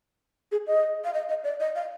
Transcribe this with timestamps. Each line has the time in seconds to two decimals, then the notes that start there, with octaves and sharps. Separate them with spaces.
0.52 G#4
0.67 D#5
1.04 F5
1.14 D#5
1.29 D#5
1.44 D5
1.60 D#5
1.75 F5